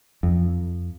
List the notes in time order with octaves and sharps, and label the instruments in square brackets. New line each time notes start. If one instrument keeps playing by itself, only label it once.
[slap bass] F2